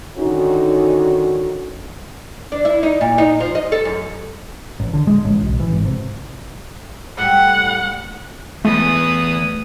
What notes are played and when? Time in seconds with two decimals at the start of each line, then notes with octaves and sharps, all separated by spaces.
0.17 D3 D#3 C#4 D#4 F#4
2.52 D4
2.65 E4
2.83 D#4
3.01 A#2
3.18 D#4
3.40 F3
3.55 D#5
3.72 A4
3.85 F#2
4.80 A1
4.93 D3
5.07 G#3
5.25 A1
5.42 B1
5.60 E3
5.73 G#1
5.85 C3
7.18 A2 G3 F#5
8.65 E2 A3 B4 D#6